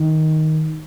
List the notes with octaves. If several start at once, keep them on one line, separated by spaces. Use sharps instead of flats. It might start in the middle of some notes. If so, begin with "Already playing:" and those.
Already playing: D#3